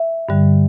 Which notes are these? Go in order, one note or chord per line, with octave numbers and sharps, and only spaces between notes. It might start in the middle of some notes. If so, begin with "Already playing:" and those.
Already playing: E5
G2 D3 G3